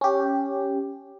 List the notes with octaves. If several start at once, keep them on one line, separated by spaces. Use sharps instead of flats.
C#4 G4